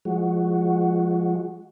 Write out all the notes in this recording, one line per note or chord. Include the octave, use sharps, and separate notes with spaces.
F3 G#3 F#4